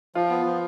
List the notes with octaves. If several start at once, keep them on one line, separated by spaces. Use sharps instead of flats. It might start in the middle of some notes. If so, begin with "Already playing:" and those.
F3 F4
B3
F3